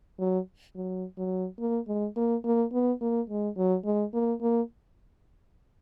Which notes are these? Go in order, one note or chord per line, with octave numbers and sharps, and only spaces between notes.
F#3
F#3
F#3
A#3
G#3
A#3
A#3
B3
A#3
G#3
F#3
G#3
A#3
A#3